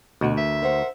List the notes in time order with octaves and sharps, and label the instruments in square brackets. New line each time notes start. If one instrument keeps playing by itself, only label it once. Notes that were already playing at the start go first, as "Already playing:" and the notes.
[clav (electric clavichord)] D2 [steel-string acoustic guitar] B2 F#4
[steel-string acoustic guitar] A#4 [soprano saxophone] E5
[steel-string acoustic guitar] A#4 C5 F#5